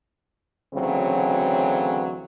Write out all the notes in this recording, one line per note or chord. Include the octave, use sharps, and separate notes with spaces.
D2 C#3 E3 F#3 C4